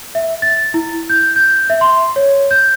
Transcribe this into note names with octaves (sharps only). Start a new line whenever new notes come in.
E5
A6
E4
G6
G6
E5
C6
C#5
G6